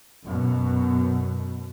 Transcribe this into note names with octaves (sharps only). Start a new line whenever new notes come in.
F#2 B2